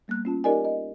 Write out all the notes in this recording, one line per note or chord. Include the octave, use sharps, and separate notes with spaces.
G3 A#3 B3 F#6
C#4 F4 A5
D#4 G4 A#4 D5 D#5 G#5
D#5